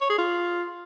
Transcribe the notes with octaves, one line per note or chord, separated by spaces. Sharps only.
C#5
G#4
F4